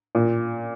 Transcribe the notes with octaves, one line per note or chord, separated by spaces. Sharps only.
A#2